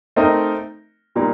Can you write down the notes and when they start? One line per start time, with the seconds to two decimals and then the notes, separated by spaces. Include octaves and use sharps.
0.16 A3 C4 D#4 A#4 D#5
1.16 A#2 G3 A#3 D#4